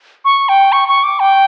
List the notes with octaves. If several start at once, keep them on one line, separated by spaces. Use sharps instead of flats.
C#6
G5
C#6
C#6
D6
G5